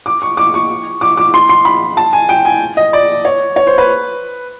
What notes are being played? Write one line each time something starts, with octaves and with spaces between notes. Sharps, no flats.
D6
C#6
D6
C#6
D6
D6
C6
C6
B5
A5
G#5
G5
G#5
D#5
D5
C#5
C#5
C5
B4